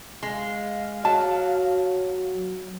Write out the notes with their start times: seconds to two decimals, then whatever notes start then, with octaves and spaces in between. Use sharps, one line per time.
0.23 G#3 F5
1.05 F#3 F#4 A5
2.30 F#3